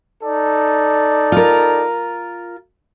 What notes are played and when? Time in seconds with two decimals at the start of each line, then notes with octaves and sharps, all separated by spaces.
0.23 D#4 A4 D5
1.32 F4 A#4